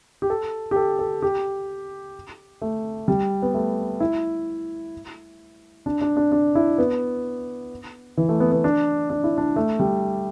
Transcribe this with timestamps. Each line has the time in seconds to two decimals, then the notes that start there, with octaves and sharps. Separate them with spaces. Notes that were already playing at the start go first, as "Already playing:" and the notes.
0.22 G4
0.30 A4
0.71 G4
0.76 A4
0.99 A4
1.22 G4
2.62 A3
3.08 G3
3.42 B3
3.54 A3
4.00 E4
5.86 D4
6.01 D4
6.17 D4
6.32 D4
6.55 E4
6.78 B3
8.17 E3
8.29 A3
8.40 B3
8.52 B3
8.64 D4
9.10 D4
9.24 E4
9.38 D4
9.56 A3
9.80 G3